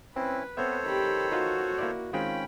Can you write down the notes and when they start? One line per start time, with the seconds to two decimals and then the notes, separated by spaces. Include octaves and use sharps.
0.16 C4 C#4 E4 B4
0.57 B3 C4 A4 C5 C#5 E5
0.85 D#3 G4 B5
1.32 D#4 F4 F#4 F#5
1.78 A#3 E4 D5
2.13 D#3 G#3 C4 C#4 F4 G5 B5